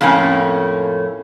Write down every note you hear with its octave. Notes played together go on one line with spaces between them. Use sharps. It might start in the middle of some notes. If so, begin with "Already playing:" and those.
F2 A2 A3 A#3 C#4